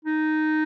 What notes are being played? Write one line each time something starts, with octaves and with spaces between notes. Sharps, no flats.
D#4